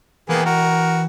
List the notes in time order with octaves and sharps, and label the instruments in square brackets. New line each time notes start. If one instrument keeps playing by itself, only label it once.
[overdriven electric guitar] E3 G5 [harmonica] A#3 B3 G#4
[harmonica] F#4 A#4